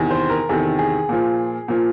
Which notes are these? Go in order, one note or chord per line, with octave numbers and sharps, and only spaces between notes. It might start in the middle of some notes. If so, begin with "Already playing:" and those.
Already playing: E2 C3 D#3
C5
A#4
E2 C3 D#3 A4
G#4
A#2 F3
A#2 F3